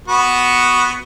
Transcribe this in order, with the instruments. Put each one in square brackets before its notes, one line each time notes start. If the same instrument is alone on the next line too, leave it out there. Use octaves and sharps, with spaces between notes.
[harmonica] B3 F#4